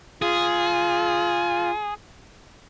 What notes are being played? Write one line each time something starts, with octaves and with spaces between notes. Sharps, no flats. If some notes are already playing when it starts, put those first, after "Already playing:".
F4 G#4